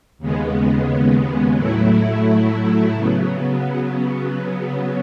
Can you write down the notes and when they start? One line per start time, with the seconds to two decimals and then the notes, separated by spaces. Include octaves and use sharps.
0.18 D#2 C#3 G#3 B3
1.56 A2 F#3 A3 E4
2.93 C#3 F#3 B3